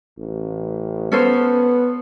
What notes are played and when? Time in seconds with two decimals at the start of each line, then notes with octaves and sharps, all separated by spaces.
0.19 A1
1.12 B3 C#4 A4 C5